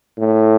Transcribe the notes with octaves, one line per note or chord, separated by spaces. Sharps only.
A2